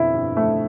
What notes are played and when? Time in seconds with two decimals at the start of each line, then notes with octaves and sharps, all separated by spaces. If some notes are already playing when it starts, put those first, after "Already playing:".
Already playing: F2 B2 D3 E4
0.15 G2
0.36 F2 A3